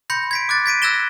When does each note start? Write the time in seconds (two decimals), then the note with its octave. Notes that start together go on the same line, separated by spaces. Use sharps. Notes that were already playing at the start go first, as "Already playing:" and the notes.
0.10 B5 C6 G6 A#6 C#7
0.31 G#6 B6 D7
0.49 D6 F#6 A6
0.66 G#6 B6 D7 D#7
0.82 E6 F#6 G#6 A#6 E7 G7